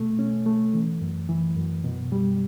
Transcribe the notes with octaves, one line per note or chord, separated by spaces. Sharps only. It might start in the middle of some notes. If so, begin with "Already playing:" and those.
Already playing: B2 A3
C#4
A3
E3
F#2
E3
F#2
B2
G3